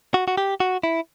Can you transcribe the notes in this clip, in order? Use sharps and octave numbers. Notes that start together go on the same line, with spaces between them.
F#4
F#4
G4
F#4
E4